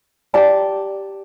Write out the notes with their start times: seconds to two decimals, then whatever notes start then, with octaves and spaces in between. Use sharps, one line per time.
0.34 G4 D5 A5